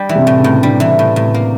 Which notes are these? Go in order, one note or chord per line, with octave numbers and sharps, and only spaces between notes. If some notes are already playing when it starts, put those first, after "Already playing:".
Already playing: G3
E3
C3
A2
C#3
A2
D3 G3
E3
A2
A2
A#3